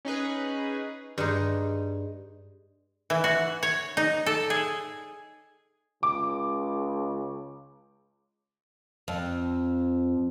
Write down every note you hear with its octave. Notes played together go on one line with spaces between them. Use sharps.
C#4 D#4 G#4 B4
G2 G#3 D#4
E3
F#4
C#5
D#4
A4
G#4
C#2 D6
F2